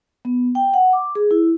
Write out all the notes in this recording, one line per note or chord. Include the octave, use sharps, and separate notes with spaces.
B3
G5
F#5
D6
G#4
E4